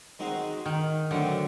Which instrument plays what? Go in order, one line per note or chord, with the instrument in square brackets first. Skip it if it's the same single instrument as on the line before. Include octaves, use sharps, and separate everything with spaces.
[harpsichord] D#3 G#3 C4 D#4 F#4
[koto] D#3
[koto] D3 [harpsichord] F#3 A3 C4